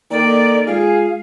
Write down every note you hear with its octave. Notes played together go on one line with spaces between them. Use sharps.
D#3 A#3 A4 D5
G#3 F4 G#4 F5